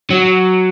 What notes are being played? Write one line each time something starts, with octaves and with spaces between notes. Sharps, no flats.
F#3